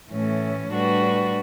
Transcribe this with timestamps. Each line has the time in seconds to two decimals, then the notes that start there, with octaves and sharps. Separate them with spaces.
0.11 A2 E3 A3 C#4
0.71 A2 G3 D4 F#4 B4